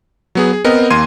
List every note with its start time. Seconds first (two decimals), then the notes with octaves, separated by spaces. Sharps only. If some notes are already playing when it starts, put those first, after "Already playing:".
0.35 F#3 B3 G#4
0.53 G#4
0.64 B3 C4 A#4 D#5
0.90 D#2 A#3 C6 G#6 D#7